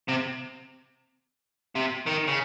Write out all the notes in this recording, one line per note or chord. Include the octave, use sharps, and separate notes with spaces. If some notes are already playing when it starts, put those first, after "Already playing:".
C3
C3
D#3
C#3